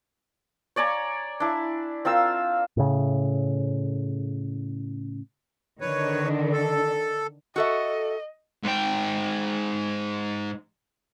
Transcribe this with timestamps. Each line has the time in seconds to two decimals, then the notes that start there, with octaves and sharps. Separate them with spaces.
0.76 C#5 D5 G#5 A#5
1.40 D4 E4
2.05 C4 F4 A#4 E6
2.77 A2 C#3
5.81 D3 D#3 D4 B4 C#5
6.52 A4
7.56 F#4 A4 D#5 E5
8.64 G#2 G5